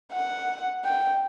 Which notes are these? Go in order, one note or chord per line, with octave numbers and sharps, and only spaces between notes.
F#5
G5